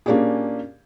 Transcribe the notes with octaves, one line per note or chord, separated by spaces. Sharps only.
A#2 A#3 C#4 D4 G4 G#4